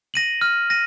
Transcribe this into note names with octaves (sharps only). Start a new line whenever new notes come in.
A#6 D#7 F#7
F6
A#6 D#7